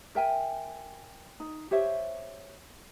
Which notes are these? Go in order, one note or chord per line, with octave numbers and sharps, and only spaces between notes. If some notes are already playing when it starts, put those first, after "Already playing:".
A#4 E5 G5 G#5
D#4
G4 C5 C#5 E5